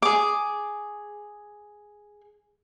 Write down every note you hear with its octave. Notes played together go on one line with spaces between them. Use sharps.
G#4 D6